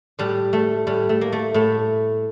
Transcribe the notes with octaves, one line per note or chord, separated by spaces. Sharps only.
A2 G3
A3
A2 G3
A3
A#3
A3
A2 A3